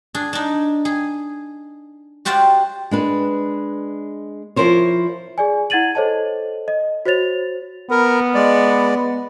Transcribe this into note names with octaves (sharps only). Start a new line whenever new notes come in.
D4 G#4
D4 D#4
G#4
F#4 G4 C5 D5 F5 F#5
G#3 D4 B4
F3 E4 A#4 C5 C#5
G#4 D5 G#5
E4 F#5 G#6 A6 D#7 F#7
A4 C5 C#5 D#5 A5
D#5
F#4 C5 C#5 A6 F7
B3 A#4
G#3 D5